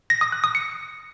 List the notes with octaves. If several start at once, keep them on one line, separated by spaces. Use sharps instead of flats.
A#6
D#6
F#6
D#6
C#7